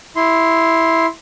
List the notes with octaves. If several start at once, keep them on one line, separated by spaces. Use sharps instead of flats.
E4 C6